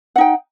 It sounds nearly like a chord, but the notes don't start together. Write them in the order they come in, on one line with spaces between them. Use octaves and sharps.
F#5 D#4 G5